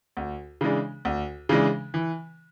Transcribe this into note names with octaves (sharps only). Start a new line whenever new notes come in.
D2
C#3 E3 G#3 D4
D2
C#3 E3 G#3 D4
E3